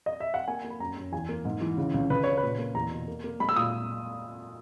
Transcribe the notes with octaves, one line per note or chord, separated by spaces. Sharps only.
D#5
E5
F#5
A#3 G#5
A#3
B5
F#2 A#5
F#2
E2 G#5
A#3
G#2
E3
C#3
C#2
C#2 B4
C#3 C#5
B4
A#2
A#3
E2 A#5
B2
A#3
A#3
G#3 B5
E6
A#2 D#6